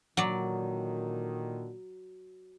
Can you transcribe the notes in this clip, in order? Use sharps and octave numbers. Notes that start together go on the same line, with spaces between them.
A#2 D3 D#3 F#3 D5